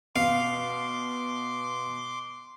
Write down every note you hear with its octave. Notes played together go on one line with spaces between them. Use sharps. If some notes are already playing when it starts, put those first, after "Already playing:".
B2 F5 C6 D6